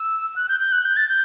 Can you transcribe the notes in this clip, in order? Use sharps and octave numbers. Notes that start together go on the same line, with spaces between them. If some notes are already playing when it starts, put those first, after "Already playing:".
Already playing: E6
F#6
G6
G6
F#6
G6
A6
G6